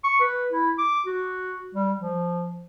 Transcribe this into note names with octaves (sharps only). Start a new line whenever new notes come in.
C#6
B4
E4
D6
F#4
G3
F3